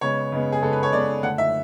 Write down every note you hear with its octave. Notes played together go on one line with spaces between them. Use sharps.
C#3 G#3 B3 C#5
C#3 G#3 B3
G#4
C#3 G#3 B3 A4
B4
C#5
C#3 G#3 B3 D5
D3 A3 F#5
E5